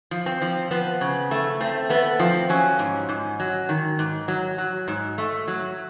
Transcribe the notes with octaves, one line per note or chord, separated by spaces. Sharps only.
F3
C4
F3
F3 B3
C#3
A3
A3 C4
A3 B3
F3 C4
F#3 C#4
G#2
G#2
F#3
D#3
G#2
F#3
F#3
G#2
A3
F#3